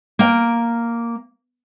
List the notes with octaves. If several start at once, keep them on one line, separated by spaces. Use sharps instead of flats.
A#3 G5